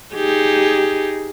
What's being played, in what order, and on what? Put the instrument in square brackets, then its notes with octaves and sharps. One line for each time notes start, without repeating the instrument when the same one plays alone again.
[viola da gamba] D#4 G4 G#4